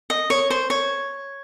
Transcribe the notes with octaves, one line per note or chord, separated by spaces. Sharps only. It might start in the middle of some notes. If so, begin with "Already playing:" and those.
D#5
C#5
C5
C#5